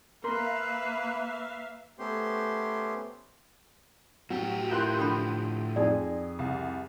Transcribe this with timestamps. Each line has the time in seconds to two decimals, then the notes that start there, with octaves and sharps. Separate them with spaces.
0.24 A#3 A#4 B4 E5 F5 C6
1.99 A3 B3 C#4 G4 C5 C6
4.30 A2 F#3 G4
4.71 E4 F4 A#4 C6 F#6 G6
4.99 D3 F3 A4 G5 B5
5.76 F2 D#4 G#4 D5
6.39 C2